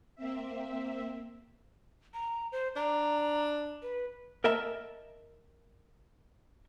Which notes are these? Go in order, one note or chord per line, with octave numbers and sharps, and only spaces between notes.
A#3 C4 E5
A#5
C5
D4 A#5
B4
A#4 D#5 E5 A5 A#5